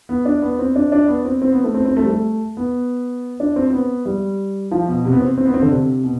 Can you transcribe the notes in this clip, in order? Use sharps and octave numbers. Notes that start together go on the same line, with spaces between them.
B3
D4
B3
C4
D4
D4
B3
C4
C4
B3
A3
C4
C4
A3
G3
A3
B3
D4
C4
C4
B3
G3
F3
B2
C3
B3
C4
C4
B3
C4
D3
C3
B2